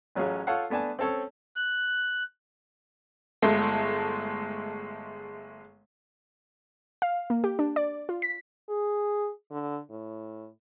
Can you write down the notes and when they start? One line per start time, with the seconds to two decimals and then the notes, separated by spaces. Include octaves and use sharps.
0.15 A1 F#3 C#4 F4 G#4
0.47 F4 A4 C#5 F5 F#5
0.70 A3 B3 D4 G#5 A5
0.99 C4 C#4 A4 C#5
1.56 F#6
3.42 G1 G#3 A3
7.02 F5
7.30 A#3
7.44 G4
7.59 D4
7.76 D5
8.09 F4
8.22 B6
8.69 G#4
9.51 D3
9.90 A2